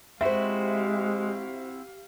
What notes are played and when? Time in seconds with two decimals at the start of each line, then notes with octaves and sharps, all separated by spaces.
0.21 G#3 C4 E4 F#4 G4 C5 E5 F5